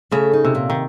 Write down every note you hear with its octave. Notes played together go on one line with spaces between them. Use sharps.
C#3 A3
D#4
C3
A#2
D#3